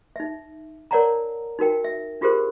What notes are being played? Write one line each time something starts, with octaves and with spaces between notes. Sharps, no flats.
D#4 E5
A#4 C#5 D5 F#5 A5 A#5
D#4 F#4 A#4 G5
E5
D4 F4 G4 G#4 A#4 C5